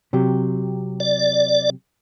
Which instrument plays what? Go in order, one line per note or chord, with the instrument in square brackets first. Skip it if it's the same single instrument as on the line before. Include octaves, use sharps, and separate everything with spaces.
[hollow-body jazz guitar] C3 F#3 G4
[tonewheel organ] D5